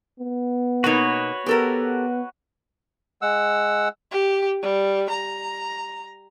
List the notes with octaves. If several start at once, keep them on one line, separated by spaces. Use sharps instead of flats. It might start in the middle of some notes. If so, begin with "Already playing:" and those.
B3
B2 A#3 D#4 F#4 B4 C#5
B3 G4 A4 A#4
G#3 F#5 E6
G4
G3
A#5